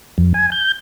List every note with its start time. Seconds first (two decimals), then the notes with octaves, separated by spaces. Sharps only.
0.18 F2
0.34 G#5
0.52 G6